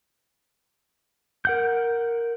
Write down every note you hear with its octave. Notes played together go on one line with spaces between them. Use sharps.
A#4 F#5 G6